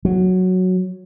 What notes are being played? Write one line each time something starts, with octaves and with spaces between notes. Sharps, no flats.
F#3